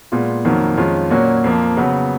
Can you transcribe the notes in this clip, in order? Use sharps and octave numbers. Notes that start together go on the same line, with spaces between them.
A#2 G#3 B3 F4
F2 D#3 F#3 A#3
F2 D#3 G#3 C#4 F4
A#2 F#3 A#3 C#4 F#4
F2 F3 A#3
C#3 F#3 B3